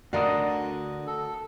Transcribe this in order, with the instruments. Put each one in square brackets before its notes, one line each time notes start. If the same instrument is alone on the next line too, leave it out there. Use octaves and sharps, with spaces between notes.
[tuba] D2 [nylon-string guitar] D3 D5 F5 [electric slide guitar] F#4 A#4 D#5
[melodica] A4